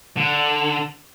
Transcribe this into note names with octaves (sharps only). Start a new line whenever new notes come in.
D3